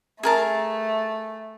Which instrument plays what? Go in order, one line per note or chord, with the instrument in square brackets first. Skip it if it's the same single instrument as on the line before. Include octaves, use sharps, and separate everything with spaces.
[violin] A3 [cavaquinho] G#4 A#4 A5